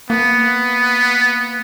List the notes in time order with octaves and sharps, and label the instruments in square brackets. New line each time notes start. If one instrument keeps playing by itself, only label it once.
[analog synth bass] A#3 [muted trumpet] B3